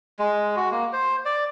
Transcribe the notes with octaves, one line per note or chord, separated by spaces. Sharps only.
G#3
F#4
A#3
C5
D5